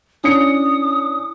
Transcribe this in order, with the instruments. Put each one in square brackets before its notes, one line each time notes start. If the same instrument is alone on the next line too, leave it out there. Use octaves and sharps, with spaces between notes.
[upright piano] C#4 D4 C#7 [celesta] E4 [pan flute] D#6